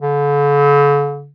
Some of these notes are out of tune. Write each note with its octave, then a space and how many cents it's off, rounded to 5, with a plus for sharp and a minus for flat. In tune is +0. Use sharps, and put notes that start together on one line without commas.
D3 -45